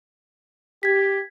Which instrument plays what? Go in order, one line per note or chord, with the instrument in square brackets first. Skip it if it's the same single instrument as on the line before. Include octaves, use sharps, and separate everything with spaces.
[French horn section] G4 [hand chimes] G#6 B6